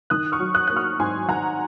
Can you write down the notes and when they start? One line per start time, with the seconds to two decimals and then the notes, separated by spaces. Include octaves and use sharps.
0.10 D#3 D#6 F#6
0.32 C#6 F6
0.39 F#3
0.55 D#6 F#6
0.68 A#3 F#6
0.76 C#6 F6
0.99 G#2 G#5 C6
1.28 D#3 F#5 A#5